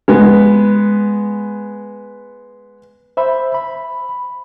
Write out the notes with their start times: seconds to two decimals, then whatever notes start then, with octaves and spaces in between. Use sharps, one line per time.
0.08 G#3 B3
3.17 C5 E5 B5
3.54 B5